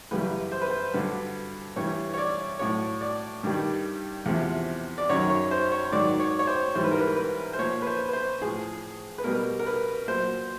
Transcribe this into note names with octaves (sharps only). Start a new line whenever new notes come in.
F#2 C#3 E3 G3 B4
C5
B4
C5
G2 D3 F#3 B4
G2 E3 G3 C#5
C#5
D5
A2 F#3 C#5
D5
G2 D#3 G3
E2 C3 F3
D5
F#2 D#3 F#3 C#5
C#5
C5
C#5
G#2 D#3 F#3 D5
C#5
C#5
C5
G#2 E3 G3 C5
B4
A#4
B4
B4
C5
A#2 F3 C#5
B4
C5
B4
C5
A2 F3 G#4
B4
B2 G3 A#4
A#4
B4
A#2 F#3 C5